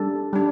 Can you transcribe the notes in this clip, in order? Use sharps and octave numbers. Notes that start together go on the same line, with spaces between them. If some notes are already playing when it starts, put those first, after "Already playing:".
Already playing: G3 D4 A4
G3 D4